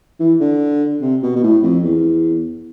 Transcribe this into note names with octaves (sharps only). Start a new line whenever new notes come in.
E3
D3
C3
B2
B2
A2
F2
E2